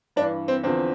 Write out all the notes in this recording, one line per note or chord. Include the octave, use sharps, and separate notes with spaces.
G2 D4
E3
C4
E2 D3 F3 C4